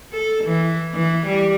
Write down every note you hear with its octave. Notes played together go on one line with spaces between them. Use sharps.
A4
E3
E3
G3